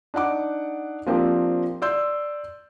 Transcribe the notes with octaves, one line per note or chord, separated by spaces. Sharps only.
D4 D#4 F#5 D6
F3 A#3 C4 D4 G4
D5 C6 E6 G6